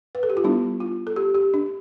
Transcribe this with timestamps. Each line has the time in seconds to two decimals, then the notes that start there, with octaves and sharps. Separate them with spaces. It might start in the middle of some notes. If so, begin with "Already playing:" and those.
0.15 B4
0.23 A4
0.30 G4
0.37 F4
0.44 G3 B3 D4 E4
0.80 F4
1.07 A4
1.16 G4
1.35 G4
1.54 D4